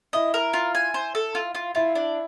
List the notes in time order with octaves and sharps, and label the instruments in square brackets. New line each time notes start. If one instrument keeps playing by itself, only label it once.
[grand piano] E4 [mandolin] D#5
[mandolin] A#4
F4
G#5
C5
A4
F4
F4
[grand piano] E4 [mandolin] F4
[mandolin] D4